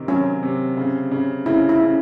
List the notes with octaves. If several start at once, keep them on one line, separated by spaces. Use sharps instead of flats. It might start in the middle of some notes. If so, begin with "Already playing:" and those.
Already playing: C3 D#3
F#3 C#4
C3
C#3
C#3
C#3 E4
E4
C#3